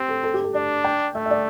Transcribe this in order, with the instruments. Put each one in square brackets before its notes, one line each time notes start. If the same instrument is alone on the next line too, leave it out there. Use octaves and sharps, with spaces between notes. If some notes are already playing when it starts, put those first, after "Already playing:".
Already playing: [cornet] C4 [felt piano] G4
[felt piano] A4
A4
G4
A4
[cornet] D4 [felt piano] D5
[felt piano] G5
[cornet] A3 [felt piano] E5
[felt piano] E5
D5